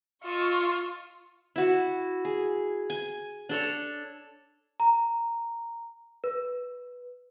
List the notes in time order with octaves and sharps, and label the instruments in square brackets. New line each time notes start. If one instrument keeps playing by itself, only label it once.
[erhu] F4 [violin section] D#5 C#6 E6
[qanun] E4 F#4
G#4
G#5
D4 A4 C#5
[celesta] A#5
B4